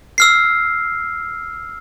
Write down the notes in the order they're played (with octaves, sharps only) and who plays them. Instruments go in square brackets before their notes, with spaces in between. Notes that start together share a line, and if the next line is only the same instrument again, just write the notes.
[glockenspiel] E6 F6 C7